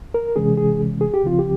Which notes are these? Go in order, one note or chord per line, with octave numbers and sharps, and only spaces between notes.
A#4
C3 E3 G#3 C#4 G#4
G#4
G#4
G4
C#2 C#3 F3 C4 F4
G4